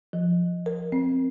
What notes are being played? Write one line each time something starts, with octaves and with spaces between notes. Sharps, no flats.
F3
A#4
C4